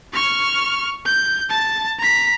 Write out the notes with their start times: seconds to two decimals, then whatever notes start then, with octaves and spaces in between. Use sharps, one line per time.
0.13 C#6 F6
1.06 G6
1.49 A5
1.99 A#5 B6